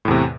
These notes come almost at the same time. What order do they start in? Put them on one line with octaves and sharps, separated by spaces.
A2 E2 C3